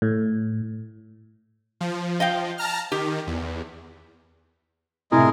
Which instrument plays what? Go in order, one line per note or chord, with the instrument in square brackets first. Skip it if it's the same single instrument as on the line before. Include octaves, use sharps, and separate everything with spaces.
[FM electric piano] A2
[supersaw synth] F3
[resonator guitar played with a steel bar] D#5 F5 G5
[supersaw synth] A5 A#5 F6
[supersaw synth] D#3 [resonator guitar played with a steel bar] G4
[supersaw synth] E2
[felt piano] A2 C3 E4 [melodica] G#3 G#4 A#4